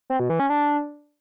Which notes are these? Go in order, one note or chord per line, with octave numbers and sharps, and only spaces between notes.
C4
B2
E3
C#4
D4